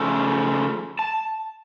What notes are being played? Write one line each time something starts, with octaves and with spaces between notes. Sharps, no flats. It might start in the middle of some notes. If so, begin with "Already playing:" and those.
Already playing: C#3 F3 A3
A5